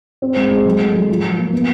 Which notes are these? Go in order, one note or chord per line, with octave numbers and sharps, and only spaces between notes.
C4
G#3
G#3
F#3
A3
F#3
F3
F3
A#3
B3